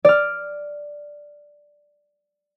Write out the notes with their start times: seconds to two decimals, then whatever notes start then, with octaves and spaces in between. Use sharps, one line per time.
0.05 D5 F6